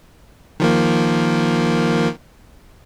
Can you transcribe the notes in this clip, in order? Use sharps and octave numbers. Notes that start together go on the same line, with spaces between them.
D#3 F3 A#3